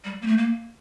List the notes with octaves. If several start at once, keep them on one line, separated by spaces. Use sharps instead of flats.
G3
A#3
A3
A#3